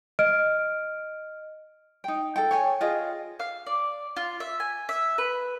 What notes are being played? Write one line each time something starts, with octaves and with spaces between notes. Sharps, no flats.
D#5 F6 D7
D#4 G5
A4 G5
C#5 G5 G#5
F4 G#4 D#5 G5
F5
D5
F4
E5
G#5
E5
B4